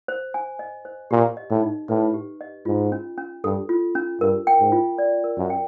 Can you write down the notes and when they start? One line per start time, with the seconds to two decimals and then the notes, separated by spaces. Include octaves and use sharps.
0.08 C5
0.34 G#5
0.59 D#5
0.85 C5
1.11 A#2 G4
1.37 D#5
1.50 A2
1.63 D#4
1.89 A2 B4
2.14 G4
2.41 D#5
2.66 G#2 F4
2.92 C#4
3.18 C#4
3.44 G2 A4
3.69 F4
3.95 C#4
4.21 G2 A#4
4.47 G5
4.60 G#2
4.72 F4
4.98 D5
5.24 A#4
5.37 F#2
5.50 G5